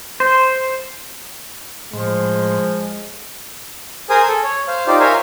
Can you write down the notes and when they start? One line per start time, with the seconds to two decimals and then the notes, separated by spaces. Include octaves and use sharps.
0.20 C5
1.93 A2 F3 G#3 C6
4.10 G#4 A#4 C5 G#5 D#6
4.28 A4
4.44 C#5
4.68 C5 F5
4.87 D#4 F4 G4 C5 D5
5.00 A#4 C5 C#5 E5 F5 G#5